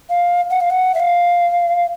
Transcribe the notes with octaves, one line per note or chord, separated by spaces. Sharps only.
F5
F#5
F5
F#5
E5
F5